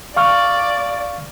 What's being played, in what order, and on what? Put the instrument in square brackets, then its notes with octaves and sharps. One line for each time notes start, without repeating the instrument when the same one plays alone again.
[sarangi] D5 [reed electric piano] F5 C#6 F6